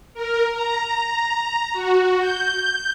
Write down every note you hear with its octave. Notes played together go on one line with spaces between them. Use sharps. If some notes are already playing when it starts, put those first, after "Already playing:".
A#4
A#5
F#4
G6